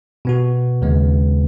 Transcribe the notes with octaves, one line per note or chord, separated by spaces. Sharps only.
B2 B3 F#4
D#2 C#3 G#3 B3